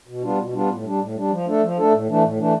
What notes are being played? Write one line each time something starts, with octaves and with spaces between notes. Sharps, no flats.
B2
G3 B3 D4 F4
B2
G3 B3 D4 F4
A2
G3 D4
A2
G3 D4
F3
A3 D4 A4
F3
A3 D4 A4
A2
E3 A3 D4
A2
E3 A3 D4